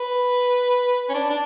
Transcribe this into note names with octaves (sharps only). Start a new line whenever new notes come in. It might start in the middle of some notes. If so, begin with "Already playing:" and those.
Already playing: B4
C#4
D4
D4